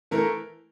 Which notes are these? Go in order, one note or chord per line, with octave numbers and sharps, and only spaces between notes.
E3 A3 E4 A#4